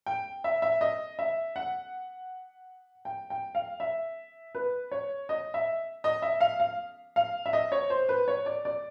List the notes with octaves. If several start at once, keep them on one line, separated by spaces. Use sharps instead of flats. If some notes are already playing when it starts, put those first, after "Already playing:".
G5
E5
E5
D#5
E5
F#5
G5
G5
F5
E5
B4
C#5
D#5
E5
D#5
E5
F5
F5
F5
E5
D#5
C#5
C5
B4
C#5
D5
D5